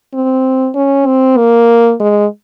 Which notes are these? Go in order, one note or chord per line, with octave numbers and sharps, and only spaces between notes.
C4
C#4
C4
A#3
G#3